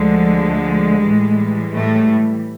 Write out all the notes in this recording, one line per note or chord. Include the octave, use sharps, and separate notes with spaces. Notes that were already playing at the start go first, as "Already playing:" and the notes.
Already playing: D2 D3 F3 G#3
A2 E3 G3
A2 A3